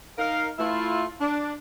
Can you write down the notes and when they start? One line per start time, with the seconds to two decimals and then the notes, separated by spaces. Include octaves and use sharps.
0.18 D#4 A#4 F5
0.58 A3 E4 F4
1.21 D4